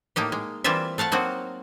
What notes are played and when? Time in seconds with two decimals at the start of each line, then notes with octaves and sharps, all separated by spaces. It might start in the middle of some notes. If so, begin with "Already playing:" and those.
0.16 A2 A#3 D#4 G4
0.32 G#3
0.64 E3 G3 A#3 C4 F4 E5
0.98 A3 F5 F#5 A5
1.12 F#3 A#3 C4 D#4 F#4